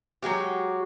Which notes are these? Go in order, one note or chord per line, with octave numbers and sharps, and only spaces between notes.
F#3 G#3 F#4 G4